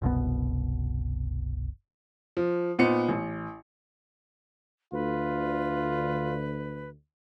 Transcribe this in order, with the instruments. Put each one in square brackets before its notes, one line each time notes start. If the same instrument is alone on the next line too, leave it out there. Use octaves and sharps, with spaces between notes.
[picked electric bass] F#1 C2 B2 B3
[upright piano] F3
A#2 B3 D#4 C5 C#7
A1
[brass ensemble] D2 [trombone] F4 [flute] B4